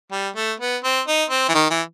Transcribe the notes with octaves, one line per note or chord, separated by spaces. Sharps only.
G3
A3
B3
C4
D#4
C4
E3
D#3
E3